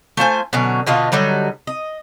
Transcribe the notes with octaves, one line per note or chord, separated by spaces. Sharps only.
A3 F4 C5 G#5
B2 D3 F#3 C#4
B2 D3 F4 D#5
D3 F#3 G3 D#4
D#5